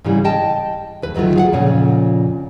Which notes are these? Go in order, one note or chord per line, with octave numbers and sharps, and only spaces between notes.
G#2 C#3 E3 G3
D#5 G5 A5
D#2 B4
D2 D#3 F#3 A3 F4
G#4 F5 F#5
F2 A#2 C#3 C#4